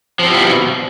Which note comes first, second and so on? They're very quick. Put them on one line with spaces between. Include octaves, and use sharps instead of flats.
F3 C4 G3 E4 B2